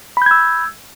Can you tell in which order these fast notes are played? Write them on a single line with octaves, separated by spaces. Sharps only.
B5 G6 G#6 E6